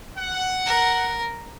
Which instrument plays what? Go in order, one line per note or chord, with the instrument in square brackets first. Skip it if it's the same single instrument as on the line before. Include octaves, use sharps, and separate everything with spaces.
[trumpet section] F#5
[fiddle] A#4